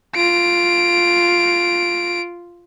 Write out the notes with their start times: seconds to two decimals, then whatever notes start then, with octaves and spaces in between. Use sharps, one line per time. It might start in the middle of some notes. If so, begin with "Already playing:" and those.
0.16 F4 D7